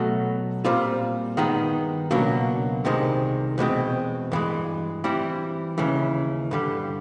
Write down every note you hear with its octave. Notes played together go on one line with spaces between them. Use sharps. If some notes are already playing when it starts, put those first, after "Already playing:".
Already playing: B2 F#3 A3
A#2 G3 C4 F4
G2 D#3 G#3 B3 D#4
C#2 B2 F#3 A#3 D4
C2 C3 D#3 G#3
E2 B2 G#3 C4
G2 E3 G#3
E3 G3 C4 E4
D#2 C#3 E3
G2 D3 G3